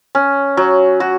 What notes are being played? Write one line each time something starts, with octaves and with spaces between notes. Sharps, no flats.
C#4
F#3
F#4